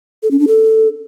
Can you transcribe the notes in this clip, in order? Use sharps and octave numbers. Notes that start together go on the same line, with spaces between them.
A4
C#4
D4
A4